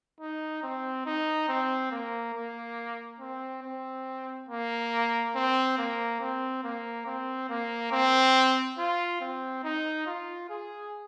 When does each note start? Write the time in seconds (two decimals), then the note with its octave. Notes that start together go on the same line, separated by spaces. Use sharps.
0.21 D#4
0.63 C4
1.06 D#4
1.49 C4
1.91 A#3
2.34 A#3
3.20 C4
3.63 C4
4.49 A#3
5.35 C4
5.78 A#3
6.21 C4
6.64 A#3
7.07 C4
7.49 A#3
7.92 C4
8.78 F4
9.21 C4
9.64 D#4
10.07 F4
10.50 G#4